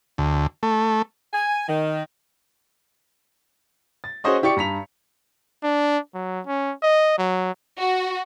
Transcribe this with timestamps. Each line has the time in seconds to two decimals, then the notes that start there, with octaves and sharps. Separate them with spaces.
0.18 D2
0.63 A3
1.34 G#5
1.68 D#3
4.04 A6
4.24 C#4 F#4 G#4 C5 D#5 C#6
4.43 E4 G4 D5 C#6 C#7
4.56 G2 A#5 B6 F7
5.63 D4
6.15 F#3
6.47 C#4
6.83 D#5
7.18 F#3
7.79 F#4